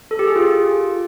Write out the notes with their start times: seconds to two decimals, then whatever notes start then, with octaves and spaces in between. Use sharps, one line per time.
0.11 A4
0.19 G4
0.27 G#4
0.36 F4